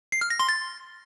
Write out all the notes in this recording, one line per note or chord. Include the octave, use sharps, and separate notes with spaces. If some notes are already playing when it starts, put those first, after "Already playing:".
C7
F6
A#6
C6
A6